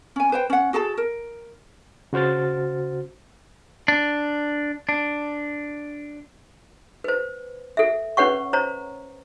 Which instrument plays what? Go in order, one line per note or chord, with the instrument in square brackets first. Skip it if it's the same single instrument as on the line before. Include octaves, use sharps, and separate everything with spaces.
[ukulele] C#4 G#5
B4 C5 G5
C#4 F#5
F#4 G#4 A4 A5
A#4
[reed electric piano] C#3 F#4 C5 F6 A6
[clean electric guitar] D4
D4
[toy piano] B4 C5
A4 E5
C#4 B4 C#5 F#5 C#6
C5 C#5 A#5